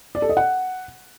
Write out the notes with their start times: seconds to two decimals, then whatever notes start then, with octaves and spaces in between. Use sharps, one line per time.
0.15 D5
0.22 A4
0.29 D#5
0.37 F#5